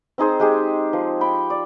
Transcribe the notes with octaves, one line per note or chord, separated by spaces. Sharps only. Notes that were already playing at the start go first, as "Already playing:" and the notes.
C4 D#4 G#4 C5
G#3 G4 G#4
F3
G5 B5
D5